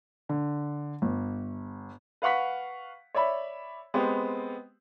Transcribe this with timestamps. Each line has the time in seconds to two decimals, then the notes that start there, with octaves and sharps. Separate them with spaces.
0.29 D3
1.02 G1
2.22 B4 F5 F#5 C#6 B6
3.15 C#5 D5 E5 B5
3.94 G#3 B3 C4 G4